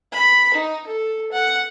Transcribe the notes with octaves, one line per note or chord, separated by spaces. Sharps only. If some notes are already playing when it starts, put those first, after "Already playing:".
B5
D#4
A4
F#5